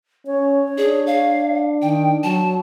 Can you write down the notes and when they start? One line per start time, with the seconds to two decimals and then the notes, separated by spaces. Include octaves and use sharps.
0.27 C#4 C#5
0.78 D4 G#4
1.07 F5
1.82 D#3 G5
2.23 F#3 A5